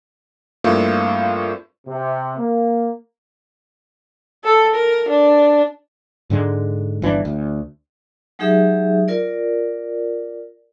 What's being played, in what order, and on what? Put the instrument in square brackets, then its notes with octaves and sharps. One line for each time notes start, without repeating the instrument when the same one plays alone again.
[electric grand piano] G2 A3 A#3 C4 E4 F4
[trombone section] C3
A#3
[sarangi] A4
A#4
D4
[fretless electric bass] G#2 D3 G#3
G1 E3 C#4 D4
D2
[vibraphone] F#3 G#3 D#4 G4 G#4 E5
F4 A#4 D5